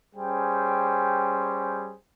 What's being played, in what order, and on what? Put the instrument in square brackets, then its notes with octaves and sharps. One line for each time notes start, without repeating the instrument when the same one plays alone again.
[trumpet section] G3 C#4 G#4 C5 G5